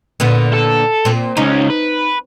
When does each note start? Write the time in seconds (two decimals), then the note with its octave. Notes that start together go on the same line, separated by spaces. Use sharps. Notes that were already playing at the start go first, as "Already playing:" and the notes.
0.20 A#2 D3 B3
0.54 A4
1.05 A#2 C4
1.37 C#2 C#4 D#4
1.70 B4